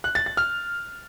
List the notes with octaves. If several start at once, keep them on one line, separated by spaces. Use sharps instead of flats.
F#6
A6
A6
F6